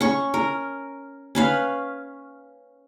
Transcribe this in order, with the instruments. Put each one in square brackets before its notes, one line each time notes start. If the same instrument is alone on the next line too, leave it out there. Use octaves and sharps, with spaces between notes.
[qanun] C#4 C#6
A#4
C#4 B4 F5